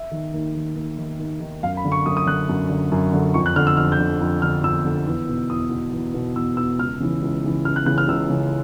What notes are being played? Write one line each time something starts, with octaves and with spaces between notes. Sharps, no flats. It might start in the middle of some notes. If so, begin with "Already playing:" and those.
Already playing: E5
D#3
D#2
D#3
D#2
D#3
D#2
D#3
F#2 F5
B5
D3
C#6
F#2 D#6
D#6
D3 F#6
F#2
D3
F#2
D3
F2 C#6
F#6
D3 F6
E6
F2 F6
G6
D3
F2
D3 F6
F2 E6
D3
E2
B2
E2 D#6
B2
E2
B2
E2 E6
B2 E6
C#2 F6
C#3 E3
C#2
C#3 E3
C#2 F6
F#6
C#3 E3 F#6
F6
C#2 E6
C#3 E3